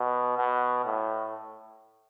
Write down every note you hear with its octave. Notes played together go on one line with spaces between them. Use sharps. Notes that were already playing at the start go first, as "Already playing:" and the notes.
Already playing: B2
B2
A2